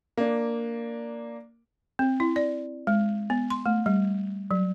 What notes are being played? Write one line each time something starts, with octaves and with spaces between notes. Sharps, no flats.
A#3 D4
C4
E4
D5
G#3
B3
C6
A3
G3
F#3